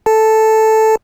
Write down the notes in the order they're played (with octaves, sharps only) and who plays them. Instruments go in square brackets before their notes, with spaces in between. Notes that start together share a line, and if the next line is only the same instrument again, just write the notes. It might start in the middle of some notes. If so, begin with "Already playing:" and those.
[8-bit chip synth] A4 A5